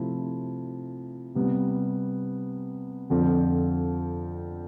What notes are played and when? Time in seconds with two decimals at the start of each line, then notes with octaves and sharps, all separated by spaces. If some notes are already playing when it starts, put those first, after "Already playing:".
Already playing: C3 F3 A3 E4
1.35 C3 G3 B3
3.10 F2 D3 F3 C4 F4